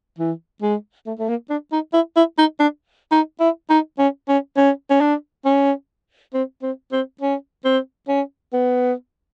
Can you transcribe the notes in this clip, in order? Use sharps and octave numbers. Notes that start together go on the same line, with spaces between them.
E3
G#3
A3
A3
A#3
D4
D#4
E4
E4
D#4
D4
D#4
E4
D#4
C#4
C#4
C#4
C#4
D4
C#4
C4
C4
C4
C#4
C4
C#4
B3